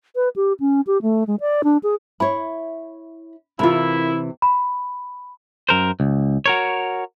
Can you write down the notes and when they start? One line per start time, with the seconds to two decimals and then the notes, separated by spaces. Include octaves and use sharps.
0.15 B4
0.36 G4
0.60 C#4
0.87 G4
1.02 A3
1.27 G#3
1.40 D5
1.64 D4
1.83 G#4
2.20 E4 C#5 B5
3.59 C3 E3 E4 F4 A#4 B5
4.42 B5
5.69 F#2 A#4 C5
6.00 C#2
6.46 F#4 A#4 C#5